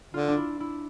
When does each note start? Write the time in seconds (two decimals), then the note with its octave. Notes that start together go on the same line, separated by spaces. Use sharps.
0.14 D3 F4
0.28 D4
0.37 E4
0.60 E4